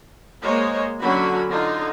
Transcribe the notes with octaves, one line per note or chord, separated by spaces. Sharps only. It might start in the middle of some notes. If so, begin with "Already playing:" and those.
G#3 A#3 C5 C#5 D#5
D3 F#3 C#4 F#4 B5
D3 D#4 F4